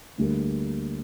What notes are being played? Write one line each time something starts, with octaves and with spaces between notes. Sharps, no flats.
D2 D3 G3 A#3